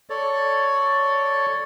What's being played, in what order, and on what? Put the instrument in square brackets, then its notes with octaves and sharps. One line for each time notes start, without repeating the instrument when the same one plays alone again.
[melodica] A4 C#5 D5